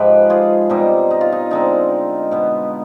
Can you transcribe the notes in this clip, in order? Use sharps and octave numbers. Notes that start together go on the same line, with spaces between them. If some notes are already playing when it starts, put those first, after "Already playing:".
Already playing: G#2 F3 G#3 G4 B4
F4 G#4
B2 G3 C4 D#4 G4
D#4
F4
D#4
D3 G#3 C4 D#4
B2 B3